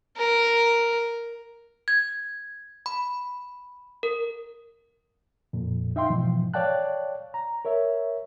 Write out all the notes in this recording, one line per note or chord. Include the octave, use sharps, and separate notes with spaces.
A#4
G#6
B5
A#4
F2 A#2
D#4 E5 F5 G5 C6
G#2 B2 E3 F3
C#5 D5 F5 G5 A5 F#6
A#5
A#4 C#5 E5